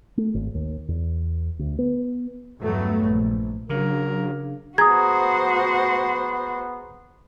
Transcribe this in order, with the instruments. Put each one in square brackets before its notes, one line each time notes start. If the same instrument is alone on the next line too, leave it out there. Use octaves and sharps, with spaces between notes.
[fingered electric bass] A3
G#1
D#2
E2
D2
B3
[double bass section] E2 G2 F#3 A3 B3
A#1
[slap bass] C#3 [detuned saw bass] F#3 [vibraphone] D4 G#4 F5 [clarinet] A#4
[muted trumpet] B3 [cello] F#4 C5 [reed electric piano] G#4 A#5 [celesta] D#6 G#6